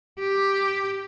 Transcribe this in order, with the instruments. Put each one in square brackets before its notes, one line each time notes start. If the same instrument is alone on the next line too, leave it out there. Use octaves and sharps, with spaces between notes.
[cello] G4